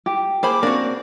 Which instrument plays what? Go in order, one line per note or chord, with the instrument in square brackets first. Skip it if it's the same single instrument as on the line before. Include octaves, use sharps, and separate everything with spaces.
[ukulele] G4
[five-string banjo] A#3 C5 B5 [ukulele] G#4 [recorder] D6
[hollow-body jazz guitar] A#3 C4 [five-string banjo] D4 F#4